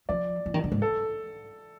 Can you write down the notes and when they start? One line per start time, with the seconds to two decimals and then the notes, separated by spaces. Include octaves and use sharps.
0.09 F3 D5
0.46 E3
0.54 D#3
0.64 D3
0.72 G#2
0.82 A4